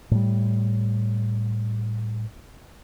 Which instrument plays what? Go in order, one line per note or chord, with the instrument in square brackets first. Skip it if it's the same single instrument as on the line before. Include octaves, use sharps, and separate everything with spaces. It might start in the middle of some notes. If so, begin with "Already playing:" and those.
[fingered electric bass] A2 G3